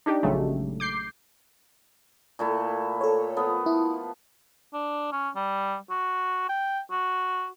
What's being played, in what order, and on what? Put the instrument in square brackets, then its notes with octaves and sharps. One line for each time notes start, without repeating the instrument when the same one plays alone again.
[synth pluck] D4 D#4 G4
A#1 C#3 F#3 G#3 A3
D6 G6 C7
[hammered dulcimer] A#2 A3 E4
[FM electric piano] A4 C#5
[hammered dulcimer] F3 B3
[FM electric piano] E4
[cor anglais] D4
C#4
G3
F#4
G5
F#4